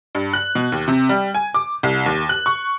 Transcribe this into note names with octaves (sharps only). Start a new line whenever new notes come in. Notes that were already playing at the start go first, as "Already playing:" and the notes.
G2
F#6
B2
D#2
C3
G3
G#5
D6
C2
D#2
F#6
C#6